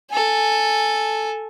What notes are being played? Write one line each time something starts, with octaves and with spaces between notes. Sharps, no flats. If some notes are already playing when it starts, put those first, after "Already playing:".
A4 G#5